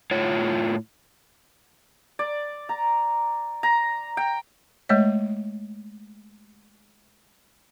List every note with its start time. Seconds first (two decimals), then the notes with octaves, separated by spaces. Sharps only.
0.11 A2 F4 C#5
2.19 D5
2.69 A#5
3.63 A#5
4.17 G5
4.89 G#3 A3 C#5 D#5